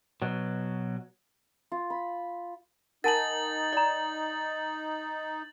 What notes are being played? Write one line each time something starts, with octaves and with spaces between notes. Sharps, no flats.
B2 F#3
F4
B5
D#4 A#4 F#5 G#5 A5 A6 F#7
D5 A#5